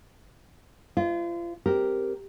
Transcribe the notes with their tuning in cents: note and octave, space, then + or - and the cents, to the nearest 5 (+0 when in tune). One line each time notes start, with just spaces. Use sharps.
F4 -35 C5 -25 D#5 +0
C4 +0 G4 +0 A#4 +0